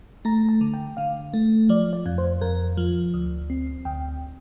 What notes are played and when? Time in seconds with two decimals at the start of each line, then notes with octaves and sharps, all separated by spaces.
0.25 A3 A#5
0.49 A5
0.61 D3
0.74 G5
0.97 D3 F5
1.34 A3
1.69 F3 D5
1.93 D5
2.06 F2
2.18 C5
2.41 F2 A#4
2.77 F3
3.14 D2
3.50 C4
3.85 D2 G5